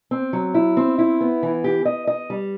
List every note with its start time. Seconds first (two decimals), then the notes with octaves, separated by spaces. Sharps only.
0.11 C4
0.33 F#3
0.54 E4
0.77 C4
0.99 E4
1.21 B3
1.43 E3
1.64 G4
1.85 D#5
2.07 D#5
2.30 G3